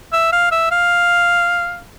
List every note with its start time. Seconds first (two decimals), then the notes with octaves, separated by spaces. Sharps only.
0.13 E5
0.32 F5
0.51 E5
0.71 F5